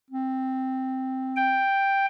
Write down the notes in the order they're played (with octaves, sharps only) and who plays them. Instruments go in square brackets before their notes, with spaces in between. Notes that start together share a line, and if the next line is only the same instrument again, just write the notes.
[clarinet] C4
[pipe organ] G5